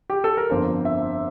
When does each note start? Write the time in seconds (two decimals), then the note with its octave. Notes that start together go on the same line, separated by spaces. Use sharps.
0.10 G4
0.24 A4
0.37 A#4
0.50 G1 F2 D3 F3 A#3 C5
0.85 E5